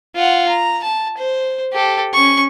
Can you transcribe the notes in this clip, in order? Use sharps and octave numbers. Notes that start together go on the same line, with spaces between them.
F4 F#5
A#5
A5
C5
G4 A4
C#4 C#6